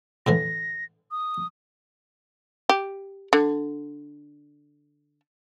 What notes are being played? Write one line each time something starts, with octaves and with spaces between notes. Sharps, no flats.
A2 D3 E3 A#6
D#6
G4
D3